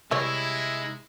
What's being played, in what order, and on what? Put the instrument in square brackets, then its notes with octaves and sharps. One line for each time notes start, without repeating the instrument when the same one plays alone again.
[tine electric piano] C3 E6 [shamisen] E3 G3 C#5 [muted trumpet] G#3 [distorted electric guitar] E4